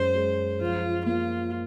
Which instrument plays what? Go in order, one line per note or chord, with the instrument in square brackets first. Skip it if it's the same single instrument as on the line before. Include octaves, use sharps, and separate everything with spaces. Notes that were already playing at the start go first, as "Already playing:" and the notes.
Already playing: [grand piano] F#2 G#3 [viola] C5
[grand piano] G#3
[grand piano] F3 [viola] F4
[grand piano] A#3 [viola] F4